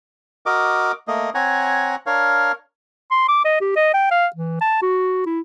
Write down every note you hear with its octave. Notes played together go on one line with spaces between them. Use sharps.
F#4 A#4 D#5 D6
A3 A#3 D#5
C4 C#5 F#5 G#5 A#5
D4 A#4 C#5 F5
C6
D6
D#5
G4
D#5
G5
F5
E3
A5
F#4
E4